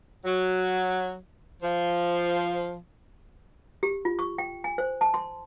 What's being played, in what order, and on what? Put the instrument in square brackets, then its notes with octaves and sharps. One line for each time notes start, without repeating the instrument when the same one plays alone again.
[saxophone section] F#3
F3
[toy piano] G4
F4
C#6
G5
G#5
C5
A5
C6